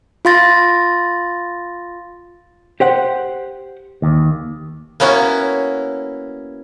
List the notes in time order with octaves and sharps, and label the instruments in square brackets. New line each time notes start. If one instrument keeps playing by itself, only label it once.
[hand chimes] F4 F5 C6 A6 A#6
[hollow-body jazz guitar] G4 C5 F#5
[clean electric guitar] D#2
[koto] A#3 B3 C#4 E4 F#4